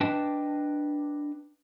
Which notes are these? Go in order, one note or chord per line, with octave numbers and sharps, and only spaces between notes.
D4 B4 D#5 G5 A5